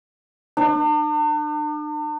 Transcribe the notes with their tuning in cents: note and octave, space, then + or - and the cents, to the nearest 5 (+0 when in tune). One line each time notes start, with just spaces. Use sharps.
D4 +45